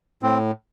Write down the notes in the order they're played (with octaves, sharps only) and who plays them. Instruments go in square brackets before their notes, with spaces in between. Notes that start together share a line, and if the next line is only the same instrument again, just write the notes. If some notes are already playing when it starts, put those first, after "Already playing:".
[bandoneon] A2 C4